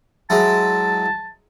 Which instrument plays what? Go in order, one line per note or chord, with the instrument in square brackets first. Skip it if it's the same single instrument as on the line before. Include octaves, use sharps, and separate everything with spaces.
[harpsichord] F#3 G#3 E4 [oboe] A5